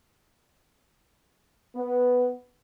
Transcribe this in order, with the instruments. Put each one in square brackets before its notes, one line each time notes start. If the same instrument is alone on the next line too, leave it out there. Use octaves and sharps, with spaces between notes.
[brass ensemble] B3